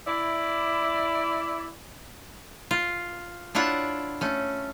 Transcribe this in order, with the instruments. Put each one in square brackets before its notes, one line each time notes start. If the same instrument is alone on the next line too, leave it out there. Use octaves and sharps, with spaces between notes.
[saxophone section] E4 D5
[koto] F4
D4 E4 F4 C#5 F#5
A3 C#4